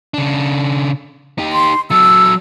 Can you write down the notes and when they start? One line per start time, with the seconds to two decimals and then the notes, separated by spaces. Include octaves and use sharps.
0.14 C#3 D4
1.38 D#4 G4
1.53 C6
1.91 F#3 A4 E6